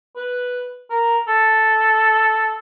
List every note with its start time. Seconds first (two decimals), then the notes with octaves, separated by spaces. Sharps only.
0.16 B4
0.90 A#4
1.28 A4